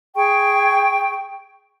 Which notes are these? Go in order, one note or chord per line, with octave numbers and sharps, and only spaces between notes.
G#4 G5 C#6